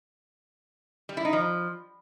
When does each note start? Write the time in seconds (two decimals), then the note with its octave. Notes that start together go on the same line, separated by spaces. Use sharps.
1.09 G3
1.17 E4
1.25 D#4
1.33 F3